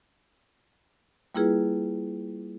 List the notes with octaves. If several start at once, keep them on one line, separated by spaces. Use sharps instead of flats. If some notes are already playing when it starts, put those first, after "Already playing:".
G3 A#3 E4 F4 G#4 B4